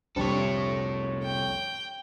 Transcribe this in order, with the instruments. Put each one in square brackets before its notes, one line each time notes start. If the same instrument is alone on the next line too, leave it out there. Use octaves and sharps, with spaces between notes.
[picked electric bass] C2 F2 [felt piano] G3 C4 D4 [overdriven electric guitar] A4 C#5
[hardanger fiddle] G5